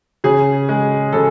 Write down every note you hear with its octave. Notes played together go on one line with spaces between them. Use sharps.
C#3 G#4
G#3
C#3 A4